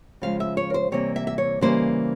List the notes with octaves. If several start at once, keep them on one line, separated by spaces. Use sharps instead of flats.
C#3 F3 G#3 F5
E5
C#5
A#4
C5
C3 E3 G3 A#3 C#5
E5
E5
C#5
C#3 E3 G3 A#3 C5